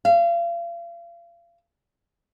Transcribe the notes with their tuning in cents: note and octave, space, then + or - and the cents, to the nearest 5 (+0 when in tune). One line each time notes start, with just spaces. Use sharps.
F5 -35